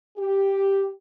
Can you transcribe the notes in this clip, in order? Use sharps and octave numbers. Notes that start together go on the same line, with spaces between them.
G4